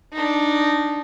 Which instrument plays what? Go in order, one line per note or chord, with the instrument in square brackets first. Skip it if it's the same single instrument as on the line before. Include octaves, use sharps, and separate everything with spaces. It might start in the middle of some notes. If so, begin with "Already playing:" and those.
[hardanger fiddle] D4 D#4